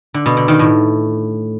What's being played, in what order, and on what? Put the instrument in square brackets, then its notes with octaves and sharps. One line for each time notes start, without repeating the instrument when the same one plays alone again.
[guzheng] D3
B2
D3
D#3
A2